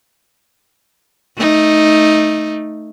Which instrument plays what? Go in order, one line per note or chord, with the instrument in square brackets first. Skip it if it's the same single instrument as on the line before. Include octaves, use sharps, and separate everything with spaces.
[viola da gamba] A3 D#4